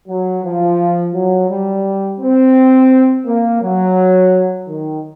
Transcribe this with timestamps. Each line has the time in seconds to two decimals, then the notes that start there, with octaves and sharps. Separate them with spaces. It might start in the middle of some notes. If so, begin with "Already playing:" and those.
0.08 F#3
0.44 F3
1.14 F#3
1.49 G3
2.21 C4
3.26 A#3
3.61 F#3
4.67 D#3